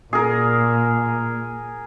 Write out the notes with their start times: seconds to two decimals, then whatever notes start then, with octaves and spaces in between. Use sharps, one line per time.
0.13 A#2 G#4 A#4